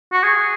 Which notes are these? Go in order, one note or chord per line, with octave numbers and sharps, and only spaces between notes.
F#4
G#4